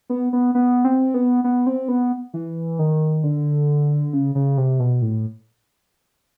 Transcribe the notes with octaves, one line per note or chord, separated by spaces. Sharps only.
B3
B3
B3
C4
B3
B3
C4
B3
E3
D#3
D3
C#3
C#3
C3
B2
A2